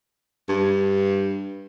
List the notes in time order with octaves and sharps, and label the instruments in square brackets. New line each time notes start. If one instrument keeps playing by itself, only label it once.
[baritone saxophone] G2